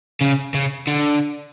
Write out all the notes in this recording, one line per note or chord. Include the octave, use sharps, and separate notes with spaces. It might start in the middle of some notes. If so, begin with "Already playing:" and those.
C#3
C#3
D3